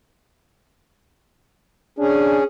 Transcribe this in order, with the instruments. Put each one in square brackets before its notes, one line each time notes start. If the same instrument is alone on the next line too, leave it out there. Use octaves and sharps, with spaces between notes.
[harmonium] C#4 G#4 [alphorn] D4